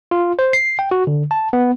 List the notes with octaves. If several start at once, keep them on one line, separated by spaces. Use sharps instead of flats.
F4
C5
C7
G5
F#4
D3
A5
B3